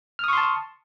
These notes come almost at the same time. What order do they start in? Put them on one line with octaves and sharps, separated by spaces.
F6 D#6 C#6 C6 A5